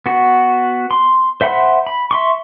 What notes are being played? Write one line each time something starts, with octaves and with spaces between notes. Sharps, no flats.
B3 F#4
C6
C5 E5 F#5 B5 C6
B5
E5 C6 C#6